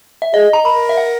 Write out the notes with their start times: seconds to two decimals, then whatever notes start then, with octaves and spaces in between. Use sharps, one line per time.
0.22 E5
0.33 G#4 D#5
0.53 A#5
0.65 A#4 B5
0.89 E5
0.97 F#5